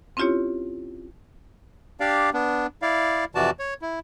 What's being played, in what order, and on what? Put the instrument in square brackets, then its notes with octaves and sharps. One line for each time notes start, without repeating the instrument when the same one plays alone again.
[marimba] C4 C#4 E4 F4 G4 C#5
[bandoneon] D4 G4 D5 F5
B3 D4
E4 D5 F5
F2 C3 E3 F#4 D5 A5
C#5
E4